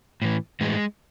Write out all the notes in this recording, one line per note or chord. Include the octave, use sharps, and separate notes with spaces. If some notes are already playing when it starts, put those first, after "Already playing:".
A2 E3
A2 E3 G#3